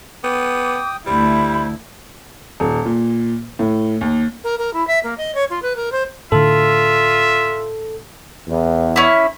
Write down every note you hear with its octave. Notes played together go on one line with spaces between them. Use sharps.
B3 G5 D6 D#6
D2 G3 E4 C5 B5
D#1
A#2
A2
D#2
A#4
A#4
E4
E5
A#3
D#5
C#5
F4
B4
A#4
C5
A2 D3 F4 A4 E5
E2
C#4 E4